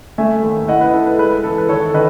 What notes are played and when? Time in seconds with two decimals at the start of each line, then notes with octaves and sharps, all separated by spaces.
0.18 A3 E5 G#5
0.43 D#2
0.68 E4 D#5 F#5
0.81 B4
0.93 E4 A4
1.06 B4
1.18 G#3 B4
1.44 E3 A4
1.58 B4
1.68 D#3 A4 C#5
1.94 D#3 B4 D#5